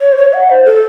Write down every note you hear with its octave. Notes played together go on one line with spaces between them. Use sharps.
C#5
C5
C#5
F#5
C5
A4